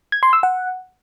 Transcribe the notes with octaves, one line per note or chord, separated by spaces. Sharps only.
G#6
C6
E6
F#5